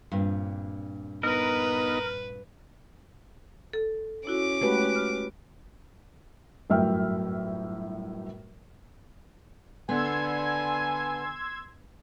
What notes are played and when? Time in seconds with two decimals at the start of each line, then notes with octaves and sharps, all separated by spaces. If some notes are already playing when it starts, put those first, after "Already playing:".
0.12 G2 A#2 C4
1.23 B3 D#4 A#4 B4 D#5
3.73 A4
4.27 C#4 E4 F#4 D6
4.61 G#3 A3 F#4 G4 B4
4.96 F6
6.69 G1 F#2 A2 E5 G5 F6
9.89 D3 B3 G#5 C6 E6 G#6